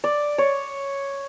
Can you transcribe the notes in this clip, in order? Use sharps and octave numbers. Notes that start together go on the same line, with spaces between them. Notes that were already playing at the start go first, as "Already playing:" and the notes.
D5
C#5